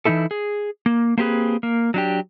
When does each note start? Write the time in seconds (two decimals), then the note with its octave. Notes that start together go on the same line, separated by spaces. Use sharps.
0.05 E3 G3 D#4 E4 A4
0.31 G#4
0.86 A#3
1.18 A#3 C4 G4 G#4 B4
1.63 A#3
1.94 F#3 D4 G4